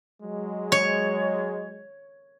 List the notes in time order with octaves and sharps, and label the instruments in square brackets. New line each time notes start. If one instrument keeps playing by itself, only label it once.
[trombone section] F#3 G#3
[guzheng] C#5